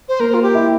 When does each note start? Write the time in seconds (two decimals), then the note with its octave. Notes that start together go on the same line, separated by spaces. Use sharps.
0.09 C5
0.19 A#3 A#4
0.34 F4
0.42 G4
0.55 E4